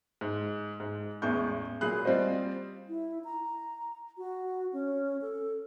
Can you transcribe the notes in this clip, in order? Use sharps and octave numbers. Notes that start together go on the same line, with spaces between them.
G#2
G#2
A1 E2 G#3 C#6 G6
A#2 F#3 G#4 B5 F#6
G3 C4 F4 C5 D#5
E4
A#5
F#4
C#4
A4